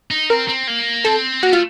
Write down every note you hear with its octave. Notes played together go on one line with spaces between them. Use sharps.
D#4
C4 A#4
C4
A#3
C4 A4
A#3 F#4
A3 F4